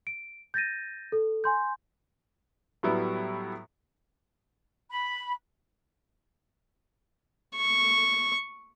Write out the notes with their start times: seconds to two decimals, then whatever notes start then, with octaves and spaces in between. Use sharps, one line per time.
0.07 D7
0.54 G6 A6 A#6 D#7
1.12 A4
1.44 G#5 C6 G6
2.83 A2 F#3 G3 B3 E4
4.91 B5
7.56 C#6